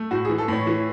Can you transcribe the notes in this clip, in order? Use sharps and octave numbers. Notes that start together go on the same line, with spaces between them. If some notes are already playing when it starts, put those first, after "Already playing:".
Already playing: A3
A2 F#4
G#4
E3
A4
A2 C#5
E3